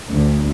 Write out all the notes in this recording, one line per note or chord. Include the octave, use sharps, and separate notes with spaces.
D2